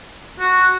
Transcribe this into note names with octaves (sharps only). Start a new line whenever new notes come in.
F#4